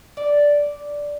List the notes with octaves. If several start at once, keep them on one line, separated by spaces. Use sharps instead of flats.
D5